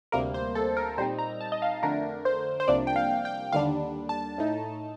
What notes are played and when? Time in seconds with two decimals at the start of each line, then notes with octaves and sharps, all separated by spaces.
0.12 D2 C3 G3 A#3 A#4
0.34 C5
0.55 A4
0.77 A#4
0.97 A#2 G3 C4 D#4 C5
1.19 A#5
1.41 A5
1.52 D#5
1.62 F5
1.83 F2 D3 A3 D4 A#4
2.25 C5
2.60 C5
2.68 C2 C3 F3 A#3 D4 D5
2.87 G5
2.96 F5
3.25 G5
3.53 D#2 D3 G3 D4 F5
4.09 A5
4.38 A2 A3 D#4